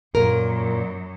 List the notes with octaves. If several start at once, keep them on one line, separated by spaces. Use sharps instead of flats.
F#2 A#2 A#4